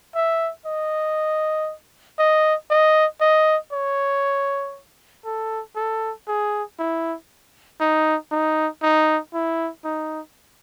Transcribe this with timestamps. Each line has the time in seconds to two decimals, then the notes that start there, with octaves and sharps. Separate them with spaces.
0.15 E5
0.66 D#5
2.19 D#5
2.70 D#5
3.21 D#5
3.72 C#5
5.25 A4
5.76 A4
6.28 G#4
6.79 E4
7.80 D#4
8.31 D#4
8.82 D#4
9.34 E4
9.85 D#4